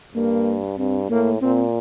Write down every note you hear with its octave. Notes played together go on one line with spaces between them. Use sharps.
G2 A#3
G2 C4
A2 A#3
A#2 C4